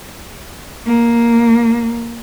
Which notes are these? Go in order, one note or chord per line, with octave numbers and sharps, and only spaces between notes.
A#3